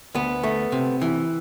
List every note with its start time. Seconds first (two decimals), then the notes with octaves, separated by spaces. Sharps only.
0.14 D2 B3
0.44 A3
0.72 C3
1.02 E3